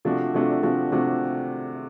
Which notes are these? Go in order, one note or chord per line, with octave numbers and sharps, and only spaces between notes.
C3 F3 A3 D4 F#4
C3 F3 A3 D4 F#4
C3 F3 A3 D4 F#4
C3 F3 A3 D4 F#4